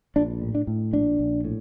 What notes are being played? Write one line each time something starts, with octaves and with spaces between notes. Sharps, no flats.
A#1 D4
A2
D4
A2
A#1 D4
A#1
A2